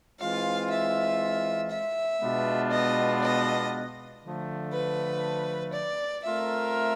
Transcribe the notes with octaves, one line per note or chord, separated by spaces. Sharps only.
E3 G#3 C4 F4 F5
E5
E5
B2 G#3 B3 D4 F4
D#5
D#5
D3 F3 A3
B4
D5
A3 C4 F4 A#4 E5